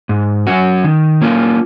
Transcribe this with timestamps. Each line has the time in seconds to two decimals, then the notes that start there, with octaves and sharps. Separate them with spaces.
0.09 G#2
0.47 F#3 C#4 F#4
0.84 D#3
1.22 A#3 C#4 F4